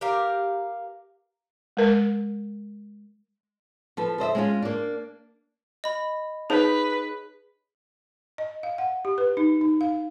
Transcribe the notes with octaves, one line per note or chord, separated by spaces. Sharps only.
G4 A#4 F5
G#3 A#4
F3 A4 B4
A4 C5 D#5 E5
G#3 C#4 F4
A#3 D4
D#5 B5
D#4 G#4 B4 C#5
D#5
F5
F#5
G4
B4
D#4
D#4
F5